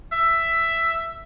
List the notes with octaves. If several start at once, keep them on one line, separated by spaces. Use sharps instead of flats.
E5